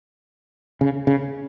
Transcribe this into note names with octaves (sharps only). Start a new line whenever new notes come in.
C#3
C#3